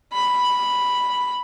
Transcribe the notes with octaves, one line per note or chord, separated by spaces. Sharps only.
B5